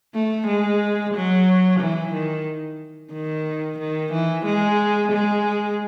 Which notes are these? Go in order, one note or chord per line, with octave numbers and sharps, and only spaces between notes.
A3
G#3
F#3
E3
D#3
D#3
D#3
E3
G#3
G#3